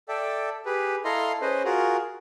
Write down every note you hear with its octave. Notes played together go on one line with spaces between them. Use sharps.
A4 D5 E5 G5
G4 G#4 B4
E4 A4 D#5 F5 A#5 C6
C#4 G#4 B4 C5 D#5
F4 F#4 G#4 A#4